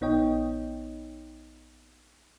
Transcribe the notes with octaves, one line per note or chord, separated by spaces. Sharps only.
A#1 B3 D#4 C#5 D#5 G5